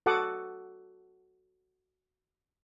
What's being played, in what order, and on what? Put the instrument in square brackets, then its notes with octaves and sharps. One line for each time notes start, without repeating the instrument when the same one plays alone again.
[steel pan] F#4 A4 F#5 A5 D6 D#6